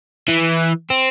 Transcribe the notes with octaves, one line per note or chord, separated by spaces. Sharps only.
E3
C4